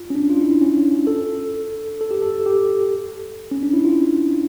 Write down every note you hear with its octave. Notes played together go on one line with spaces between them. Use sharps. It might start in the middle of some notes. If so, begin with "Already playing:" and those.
Already playing: F4
C#4
D4
F4
E4
D4
C#4
A4
A4
G4
A4
G4
C#4
D4
E4
F4